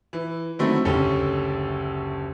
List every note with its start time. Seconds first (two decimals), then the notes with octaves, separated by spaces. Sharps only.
0.13 E3
0.59 D3 D#3 F#3 A3 C4 E4
0.85 F#1 D2 C#4 G4 A4